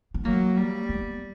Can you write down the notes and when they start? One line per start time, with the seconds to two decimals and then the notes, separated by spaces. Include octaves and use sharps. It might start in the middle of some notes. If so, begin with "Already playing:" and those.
0.14 B3
0.25 F#3 A#3
0.57 G3
0.89 B3